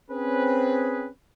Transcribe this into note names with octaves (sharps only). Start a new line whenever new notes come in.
C4 C#4 G#4 B4